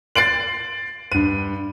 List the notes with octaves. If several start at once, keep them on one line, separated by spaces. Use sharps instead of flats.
A6 C7 D7 F#7
G2 D#7